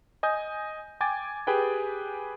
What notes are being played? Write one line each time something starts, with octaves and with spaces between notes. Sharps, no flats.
D#5 G#5 D#6 G6
G5 G#5 D6 G#6 A6
G4 G#4 B4 G5 G#5